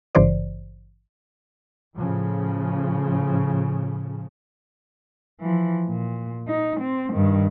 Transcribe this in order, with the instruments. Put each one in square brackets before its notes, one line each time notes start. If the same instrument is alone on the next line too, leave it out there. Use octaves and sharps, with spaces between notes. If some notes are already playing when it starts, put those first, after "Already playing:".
[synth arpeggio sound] G#1 G2 C#3 E3 C5 D5
[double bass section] A2 C#3 F3
[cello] E3 F3
A#2
D#4
C4
G2 D#3